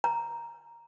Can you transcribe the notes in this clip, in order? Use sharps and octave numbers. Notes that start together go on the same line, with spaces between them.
A#5